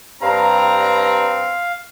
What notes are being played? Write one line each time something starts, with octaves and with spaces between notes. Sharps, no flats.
G2 C4 F5 A#5